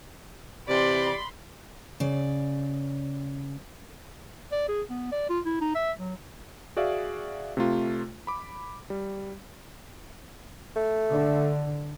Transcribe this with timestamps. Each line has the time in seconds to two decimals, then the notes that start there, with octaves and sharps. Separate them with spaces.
0.69 C3 E3 G4 D5 B5 C6
2.00 C#3 D5
4.52 D5
4.68 G#4
4.90 B3
5.12 D5
5.29 F4
5.45 E4
5.61 D#4
5.75 E5
5.99 F#3
6.77 F#4 G#4 D5 E5 F5
7.57 C3 A3 F4
8.27 B5 D6
8.90 G3
10.76 A3
11.12 D3